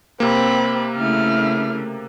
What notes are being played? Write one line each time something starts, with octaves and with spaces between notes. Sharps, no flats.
C3 A#3 C4 B5
C#3 A3 E4 F6